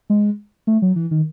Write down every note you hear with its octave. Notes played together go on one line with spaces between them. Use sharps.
G#3
A3
F#3
E3
D#3